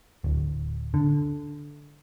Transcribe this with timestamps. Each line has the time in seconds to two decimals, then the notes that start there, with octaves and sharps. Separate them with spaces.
0.24 D1
0.94 D3